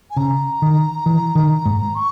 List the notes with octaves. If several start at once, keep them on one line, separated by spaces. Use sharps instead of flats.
G#5
C#3 A#5
D#3
E3
D#3
G#2
C#6